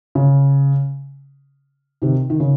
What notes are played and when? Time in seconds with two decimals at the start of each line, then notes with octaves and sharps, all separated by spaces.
0.15 C#3
2.02 C3 D#3
2.30 D#3
2.40 C#3